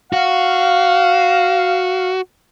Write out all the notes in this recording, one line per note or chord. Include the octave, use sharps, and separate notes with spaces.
F#4 F5